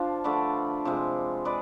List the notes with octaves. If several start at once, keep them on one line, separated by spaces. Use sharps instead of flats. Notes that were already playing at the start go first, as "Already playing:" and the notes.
Already playing: F3 D4 F4
D3 F3 A3 B4 D5
C3 F3 G#3
G#3 B4 D5